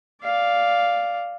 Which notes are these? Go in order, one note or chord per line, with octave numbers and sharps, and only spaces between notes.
D5 F5